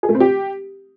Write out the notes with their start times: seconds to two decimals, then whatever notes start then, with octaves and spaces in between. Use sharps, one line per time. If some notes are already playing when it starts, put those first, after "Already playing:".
0.03 G#4
0.09 A3
0.15 C4
0.20 G4